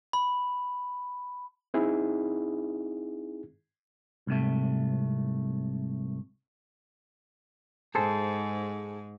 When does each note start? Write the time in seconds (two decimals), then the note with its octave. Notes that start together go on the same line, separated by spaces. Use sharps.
0.13 B5
1.74 C4 D#4 E4 G#4
4.27 C2 G#2 C3 A3
7.95 G#2 G#4 A4 C5